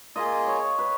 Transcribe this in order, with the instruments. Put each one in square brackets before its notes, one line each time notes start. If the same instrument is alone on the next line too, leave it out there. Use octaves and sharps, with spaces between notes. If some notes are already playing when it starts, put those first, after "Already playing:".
[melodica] A#3 F4 G#4 [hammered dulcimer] D#5
[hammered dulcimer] C#5
B4